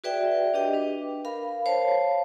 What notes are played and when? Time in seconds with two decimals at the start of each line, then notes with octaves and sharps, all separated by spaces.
0.04 F#4 G#4 B4 D5 E5 G5
0.54 D4 G4 D#5 G5
0.73 D4 B4
1.25 A#4 F5 B5
1.66 C5 C#5 F5 A5